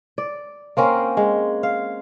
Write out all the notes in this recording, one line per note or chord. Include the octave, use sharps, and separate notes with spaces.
D5
A#3 C4 C#4 A#4
G#3
F5